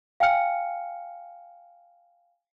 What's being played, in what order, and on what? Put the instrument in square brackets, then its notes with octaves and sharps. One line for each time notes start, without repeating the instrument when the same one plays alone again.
[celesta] F5 G5 G#5 F6 C#7